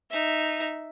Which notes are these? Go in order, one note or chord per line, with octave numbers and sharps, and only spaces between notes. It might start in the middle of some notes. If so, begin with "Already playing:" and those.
D#4 E5